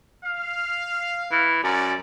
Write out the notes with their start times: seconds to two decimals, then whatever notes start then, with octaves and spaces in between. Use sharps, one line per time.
0.25 F5
1.32 E3
1.63 F#2 C#4 D5